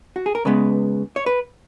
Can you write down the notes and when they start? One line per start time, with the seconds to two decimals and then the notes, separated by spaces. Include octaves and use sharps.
0.16 F#4
0.26 G#4
0.35 A#4
0.45 C#3 G#3 B3 B4
1.16 C#5
1.26 B4